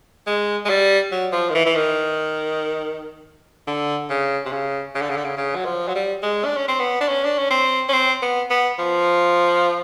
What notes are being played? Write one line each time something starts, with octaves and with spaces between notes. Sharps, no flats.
G#3
G#3
G3
F#3
F3
D#3
E3
E3
D#3
D3
C#3
C3
C#3
C#3
D3
C#3
D3
C#3
C#3
F#3
F3
F#3
G3
G#3
D4
C#4
C4
B3
D4
C#4
D4
C#4
C4
C#4
C4
B3
B3
F3